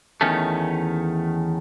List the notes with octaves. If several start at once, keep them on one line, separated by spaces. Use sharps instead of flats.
E2 D#3 A3 C#4